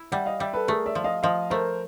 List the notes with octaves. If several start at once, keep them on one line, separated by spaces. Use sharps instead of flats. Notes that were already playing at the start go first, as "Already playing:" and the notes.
Already playing: E4
G3 E5 F#5
D#5 F5
G3 D5 E5
A4 B4
A3 G#4 A#4
D5 E5
F3
D#5 F5
F3 D#5 F5
A3 A#4 C5